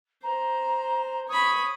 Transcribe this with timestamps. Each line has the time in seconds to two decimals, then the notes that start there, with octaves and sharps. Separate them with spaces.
0.23 C5 A#5
1.28 C#5 B5 D#6